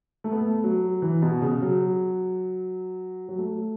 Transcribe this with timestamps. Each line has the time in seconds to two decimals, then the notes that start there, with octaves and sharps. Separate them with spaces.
0.24 A3
0.32 B3
0.41 A3
0.64 F#3
1.02 E3
1.22 B2
1.42 C#3
1.62 F#3
3.28 F#3
3.38 A3